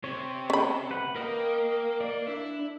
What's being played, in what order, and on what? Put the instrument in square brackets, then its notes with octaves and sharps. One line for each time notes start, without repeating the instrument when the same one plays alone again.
[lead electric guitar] C3 [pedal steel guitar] C#5
[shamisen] C#4 B5
[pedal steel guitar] B4 F#5
[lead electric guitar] A#3 [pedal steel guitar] A#4 D#5 G5
[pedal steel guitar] D5
[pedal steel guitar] D4 [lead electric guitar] E4